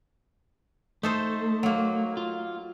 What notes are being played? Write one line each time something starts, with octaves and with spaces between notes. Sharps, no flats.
A3 D#4 A4 C5
F#3 A#3
F4